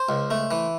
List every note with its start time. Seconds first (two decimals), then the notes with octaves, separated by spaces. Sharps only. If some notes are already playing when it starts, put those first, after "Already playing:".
Already playing: C5
0.09 C#2
0.31 A3
0.51 E3